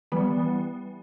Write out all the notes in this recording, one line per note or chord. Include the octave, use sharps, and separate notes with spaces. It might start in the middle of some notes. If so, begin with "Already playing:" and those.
E3 G3 B3